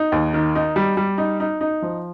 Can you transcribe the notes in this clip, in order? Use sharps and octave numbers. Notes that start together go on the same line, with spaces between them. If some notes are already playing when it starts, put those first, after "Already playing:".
Already playing: D#4
D#2
D#3
D#4
G3
G3
D#4
D#4
D#4
F3